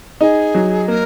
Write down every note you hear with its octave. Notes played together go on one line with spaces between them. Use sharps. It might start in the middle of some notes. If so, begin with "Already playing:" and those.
D#4 G#4
F#3
A#3 A#4